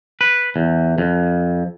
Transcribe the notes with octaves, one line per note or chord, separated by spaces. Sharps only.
B4
E2
F2